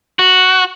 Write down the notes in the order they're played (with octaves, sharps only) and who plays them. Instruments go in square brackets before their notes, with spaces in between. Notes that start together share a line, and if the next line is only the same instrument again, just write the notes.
[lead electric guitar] F#4